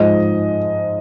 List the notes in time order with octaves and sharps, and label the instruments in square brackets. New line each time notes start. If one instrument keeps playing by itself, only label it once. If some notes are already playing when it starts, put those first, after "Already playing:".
Already playing: [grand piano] G#2 F3 G#3 D#5